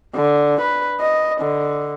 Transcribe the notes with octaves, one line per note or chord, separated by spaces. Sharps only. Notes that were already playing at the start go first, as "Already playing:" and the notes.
D3
B4
D#5
D3